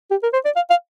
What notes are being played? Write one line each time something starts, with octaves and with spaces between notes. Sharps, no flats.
G4
A#4
C5
D5
F5
F5